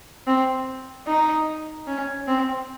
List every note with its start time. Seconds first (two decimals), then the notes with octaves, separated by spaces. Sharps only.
0.27 C4
1.07 D#4
1.87 C#4
2.28 C4